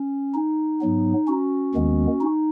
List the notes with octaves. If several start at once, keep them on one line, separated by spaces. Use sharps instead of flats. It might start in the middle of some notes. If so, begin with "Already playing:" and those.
Already playing: C#4
D#4
G#2 F#3 B3
C#4 F#4
D#2 D#3 G#3 B3
D#4